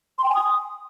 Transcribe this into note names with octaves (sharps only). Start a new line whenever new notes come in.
C6
G5
G#5
D#6